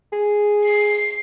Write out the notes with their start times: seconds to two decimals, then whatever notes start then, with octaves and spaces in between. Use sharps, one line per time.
0.13 G#4
0.65 C7